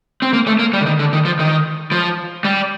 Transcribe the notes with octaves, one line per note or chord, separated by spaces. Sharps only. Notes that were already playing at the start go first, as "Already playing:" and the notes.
C4
A#3
A3
A#3
G3
D3
D#3
D3
D#3
F3
D#3
F3
G3